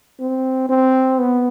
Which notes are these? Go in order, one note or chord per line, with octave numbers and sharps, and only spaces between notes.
C4
C4
B3